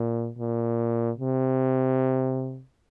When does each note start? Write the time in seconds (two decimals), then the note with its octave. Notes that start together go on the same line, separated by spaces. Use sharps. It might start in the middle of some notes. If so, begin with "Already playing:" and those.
Already playing: A#2
0.39 A#2
1.18 C3